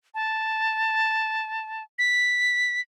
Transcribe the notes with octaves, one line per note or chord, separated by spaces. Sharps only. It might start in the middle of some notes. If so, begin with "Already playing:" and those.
A5
B6